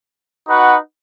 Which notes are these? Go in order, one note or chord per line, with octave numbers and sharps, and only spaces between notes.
D#4 F#4 B4 F#5